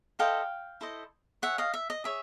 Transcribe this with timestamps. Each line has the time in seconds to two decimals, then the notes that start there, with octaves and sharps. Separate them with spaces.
0.19 E4 A4 C5 D#5 F5 G5
0.81 E4 A4 C5 D#5
1.42 G#4 C#5 E5 F#5
1.58 D#5 F5
1.74 E5
1.90 D#5
2.04 G#4 C#5 E5